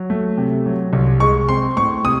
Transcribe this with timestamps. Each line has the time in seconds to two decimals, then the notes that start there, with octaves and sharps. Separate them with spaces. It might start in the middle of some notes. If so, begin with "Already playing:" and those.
Already playing: F#3
0.10 A3
0.37 C3
0.66 F#3
0.93 C2
1.20 G#3 C#6
1.48 C4 C6
1.77 A2 C#6
2.04 C3 D#6